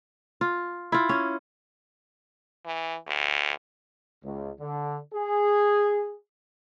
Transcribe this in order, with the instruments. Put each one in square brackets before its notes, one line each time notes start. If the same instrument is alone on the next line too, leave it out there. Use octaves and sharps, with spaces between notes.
[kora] F4
E4 F4
C#4
[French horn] E3
D2
[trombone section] C#2
D3
G#4